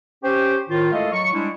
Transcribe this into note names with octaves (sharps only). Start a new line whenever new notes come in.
C#4 G4 C5
A2 D#3 F4
G#3 A3 E4 A4 D#5 F5
F#3 C#6
G3 G#3 D4 E4